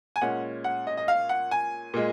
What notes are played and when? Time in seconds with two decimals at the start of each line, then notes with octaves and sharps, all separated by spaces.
0.16 G#5
0.21 A#2 G#3 C#4 F#5
0.64 F#5
0.87 D#5
0.97 D#5
1.08 F5
1.29 F#5
1.51 G#5
1.94 A#2 G#3